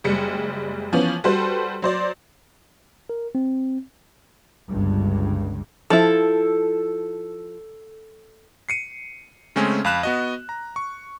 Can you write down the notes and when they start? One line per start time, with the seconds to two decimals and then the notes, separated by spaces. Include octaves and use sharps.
0.04 F#1 G3 G#3 C#7
0.93 E3 F3 B3 C#4
1.24 G3 F#4 A4 B4 C5
1.82 F#3 C5 D5
3.10 A#4
3.35 C4
4.68 G1 C#2 G2
5.90 F3 E4 A4
8.69 C7 C#7 D#7
9.56 C#3 G#3 A3 C4 C#4 G#5
9.84 F2 F5 B5 F#6 E7
10.03 B3 F#4 D#5
10.49 A#5
10.76 C#6